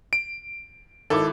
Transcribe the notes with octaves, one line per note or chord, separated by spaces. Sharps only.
D7
G#1 E4 A4 D6